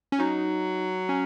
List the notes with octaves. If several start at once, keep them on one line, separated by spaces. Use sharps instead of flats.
C#4
F#3 D#4
C#4